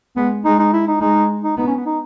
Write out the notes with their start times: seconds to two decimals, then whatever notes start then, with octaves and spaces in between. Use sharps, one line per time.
0.16 G#3 B3
0.44 G#3 D#4
0.59 D#4
0.73 E4
0.87 D#4
1.00 G#3 D#4
1.44 D#4
1.57 B3 D#4
1.67 C#4
1.76 B3
1.86 D#4